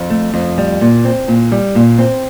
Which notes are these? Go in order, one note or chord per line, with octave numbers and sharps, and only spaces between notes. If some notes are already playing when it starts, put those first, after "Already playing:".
Already playing: F2
A3
F2
G3
A#2
C4
A#2
G3
A#2
C4